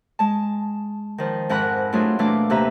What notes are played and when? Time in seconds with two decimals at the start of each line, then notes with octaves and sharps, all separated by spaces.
0.19 G#3 A5
1.18 D#3 F3
1.49 F2 G#2 A#4 F#5 B5 F#6
1.93 F#3 A3 D4 E4 F4 G#4
2.19 A#2 E3 A3 D4 F5 D6
2.50 D#2 C3 B4 E5 A#5